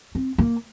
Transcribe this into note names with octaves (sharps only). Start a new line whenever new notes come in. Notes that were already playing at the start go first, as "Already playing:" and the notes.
C4
A#3